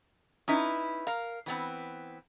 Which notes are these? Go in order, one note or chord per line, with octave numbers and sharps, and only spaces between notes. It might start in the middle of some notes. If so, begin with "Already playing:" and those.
C#4 D#4 E4 B4
A#4 F5
E3 B3 C4